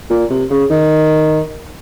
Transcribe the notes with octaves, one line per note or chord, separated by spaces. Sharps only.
A#2
C3
C#3
D#3